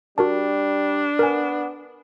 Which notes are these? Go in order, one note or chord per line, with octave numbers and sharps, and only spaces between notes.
G3 D4 F#4 A#4 A5
B3 A#4 G#5